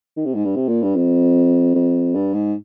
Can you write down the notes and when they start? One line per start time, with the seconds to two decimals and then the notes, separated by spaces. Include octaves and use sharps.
0.16 D#3
0.26 C3
0.35 G#2
0.45 G2
0.56 C3
0.68 A#2
0.83 G2
0.96 F2
1.75 F2
2.15 G2
2.34 G#2